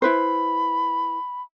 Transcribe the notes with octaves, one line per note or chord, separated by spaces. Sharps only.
E4 B4 C5 B5